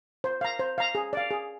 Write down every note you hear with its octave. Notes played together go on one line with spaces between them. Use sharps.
C5
F5 A#5
C5
F5 A#5
G#4
D5 F5
G#4